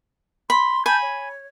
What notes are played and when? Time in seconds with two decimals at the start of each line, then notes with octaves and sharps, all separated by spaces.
0.50 B5 C6
0.86 G#5 A5 B5 G6
1.03 C#5